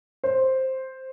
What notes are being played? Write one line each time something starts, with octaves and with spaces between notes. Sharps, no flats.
C5